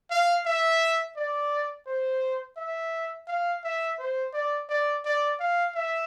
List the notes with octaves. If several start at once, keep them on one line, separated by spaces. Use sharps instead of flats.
F5
E5
D5
C5
E5
F5
E5
C5
D5
D5
D5
F5
E5